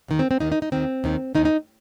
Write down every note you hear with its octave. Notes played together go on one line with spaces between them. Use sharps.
D#2 D#3
C4
C4
D#2 D#3 D#4
D#4
D#4
D#2 D#3 C4
D#2 D#3
D#2 D#3 D#4
D#4